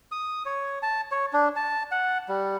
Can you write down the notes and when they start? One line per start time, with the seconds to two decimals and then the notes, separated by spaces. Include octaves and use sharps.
0.12 D#6
0.46 C#5
0.83 A5
1.11 C#5
1.33 D4
1.56 A5
1.91 F#5
2.29 G3